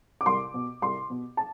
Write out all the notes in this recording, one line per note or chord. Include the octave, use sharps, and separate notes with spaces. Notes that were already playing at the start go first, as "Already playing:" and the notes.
D6
C2 C6
B2
C2 C6
B2
A5